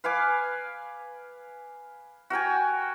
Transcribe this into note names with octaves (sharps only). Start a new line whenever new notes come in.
B4 F5 G#5 D6
F#4 A#4 G5 G#5